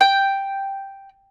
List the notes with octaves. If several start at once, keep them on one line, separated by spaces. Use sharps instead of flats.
G5